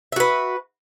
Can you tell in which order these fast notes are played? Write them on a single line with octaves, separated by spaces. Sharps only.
E5 F#4 B4